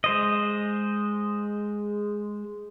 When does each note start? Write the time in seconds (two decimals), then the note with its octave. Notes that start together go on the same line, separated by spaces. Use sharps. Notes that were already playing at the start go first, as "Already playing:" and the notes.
0.04 G#3 C5 D#5